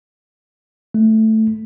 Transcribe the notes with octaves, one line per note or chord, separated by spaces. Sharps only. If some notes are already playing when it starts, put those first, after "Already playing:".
A3